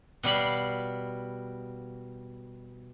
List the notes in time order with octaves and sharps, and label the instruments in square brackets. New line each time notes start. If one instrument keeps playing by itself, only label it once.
[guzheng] B2 G3 F5 B5